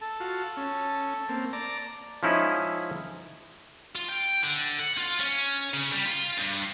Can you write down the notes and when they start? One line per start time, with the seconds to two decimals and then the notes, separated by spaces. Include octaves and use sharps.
0.01 A4 A5
0.20 F4 F#4
0.57 C#4
1.29 A#3 C4
1.53 D5 A5 A#5
2.23 F3 G#3 C#4 D#4 E4
3.96 F4
4.09 G5
4.44 D3
4.79 F#5
4.97 F4
5.20 C#4
5.74 C#3
5.92 G3
6.05 F4
6.38 G2